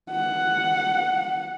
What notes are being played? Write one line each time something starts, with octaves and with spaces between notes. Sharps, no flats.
F#5